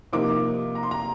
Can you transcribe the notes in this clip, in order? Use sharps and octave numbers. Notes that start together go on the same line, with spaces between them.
C3 F3 A#3 D#4 D6
A#5
C6
A#5